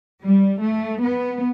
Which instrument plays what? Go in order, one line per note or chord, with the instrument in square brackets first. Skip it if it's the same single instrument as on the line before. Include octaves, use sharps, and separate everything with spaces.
[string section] G3
A3
B3